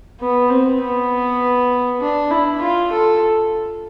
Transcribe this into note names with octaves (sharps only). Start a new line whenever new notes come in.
B3
C4
B3
D4
E4
F4
A4